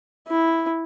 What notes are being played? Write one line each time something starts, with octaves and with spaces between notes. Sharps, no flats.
E4